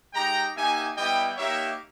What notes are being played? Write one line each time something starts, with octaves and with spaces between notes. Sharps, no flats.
G#3 D#4 G4 G5 A#5
A#3 D#4 G4 E5 G#5
G3 B3 E4 D#5 G5
A#3 D#4 G4 C#5 E5